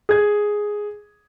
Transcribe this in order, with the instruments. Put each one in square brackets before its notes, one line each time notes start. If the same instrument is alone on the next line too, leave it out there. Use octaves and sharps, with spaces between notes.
[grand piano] G#4 G#6